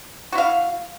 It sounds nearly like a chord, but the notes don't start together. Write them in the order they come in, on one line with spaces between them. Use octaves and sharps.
F#4 E4 F5